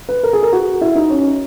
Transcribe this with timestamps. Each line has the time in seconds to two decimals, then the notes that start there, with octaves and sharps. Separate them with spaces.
0.09 B4
0.23 A#4
0.33 G#4
0.43 A#4
0.52 F#4
0.81 E4
0.95 D#4
1.10 C#4